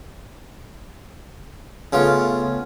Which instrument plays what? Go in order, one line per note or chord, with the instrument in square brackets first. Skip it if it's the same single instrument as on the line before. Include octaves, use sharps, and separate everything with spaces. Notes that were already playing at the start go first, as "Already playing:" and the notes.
[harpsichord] C#3 F4 [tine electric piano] A3 B3 C#4